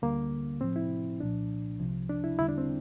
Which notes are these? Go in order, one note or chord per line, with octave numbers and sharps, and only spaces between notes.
D2 D3 G3 A#3
A2 F3 C4
E4
C2 A#2 F3 D4
C2 C3 F3
D4
E4
E2 D3 G3 E4
D4
C4